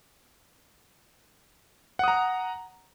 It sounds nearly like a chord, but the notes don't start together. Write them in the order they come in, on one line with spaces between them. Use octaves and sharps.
F#5 D#6 A#5